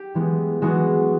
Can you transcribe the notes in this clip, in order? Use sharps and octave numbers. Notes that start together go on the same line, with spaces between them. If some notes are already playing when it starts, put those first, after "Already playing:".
Already playing: G4
E3 G#3 B3
E3 G#3 B3 F#4